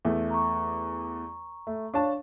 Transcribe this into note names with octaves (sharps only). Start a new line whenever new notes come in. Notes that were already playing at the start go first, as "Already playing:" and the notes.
E2 A3
A#5 C#6
A3
D4 C#5 F5 A5 C#6